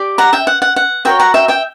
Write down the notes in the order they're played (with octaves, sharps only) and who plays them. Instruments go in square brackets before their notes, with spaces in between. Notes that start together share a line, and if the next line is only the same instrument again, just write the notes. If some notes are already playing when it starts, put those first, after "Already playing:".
Already playing: [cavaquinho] G4 D5
F#5 A#5
E5 G5
F#5
F#5
F#5
F#4 A#4 C#5 E5 G5
F#5 A#5
E5 G5
E5 G5